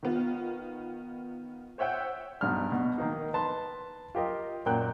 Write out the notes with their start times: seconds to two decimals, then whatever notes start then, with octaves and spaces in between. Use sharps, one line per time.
0.03 D#3 B3 F4
1.78 C5 C#5 E5 F#5 G5 E6
2.41 B1 G2 F6
2.72 B2
2.98 D#3 A#3 D#4
3.33 B4 A5 C6
4.15 F4 G4 A#4 D#5
4.66 F#2 A#2 G5 F#6